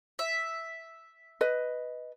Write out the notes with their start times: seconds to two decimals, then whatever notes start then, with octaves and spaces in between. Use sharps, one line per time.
0.19 E5
1.41 B4 D#5